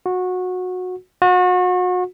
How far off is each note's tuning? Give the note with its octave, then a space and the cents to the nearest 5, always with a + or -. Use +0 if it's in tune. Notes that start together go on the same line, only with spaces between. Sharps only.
F#4 -20
F#4 -35